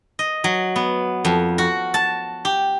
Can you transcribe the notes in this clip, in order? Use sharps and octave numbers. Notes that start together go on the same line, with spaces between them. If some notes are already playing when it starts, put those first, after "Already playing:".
D#5
F#3
B3
F2
F#4
A5
G4